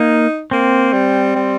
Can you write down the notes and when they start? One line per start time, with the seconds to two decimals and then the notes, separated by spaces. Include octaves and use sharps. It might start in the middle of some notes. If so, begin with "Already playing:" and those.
Already playing: A#3 D#4
0.51 A#3 C4
0.93 G3
1.35 G3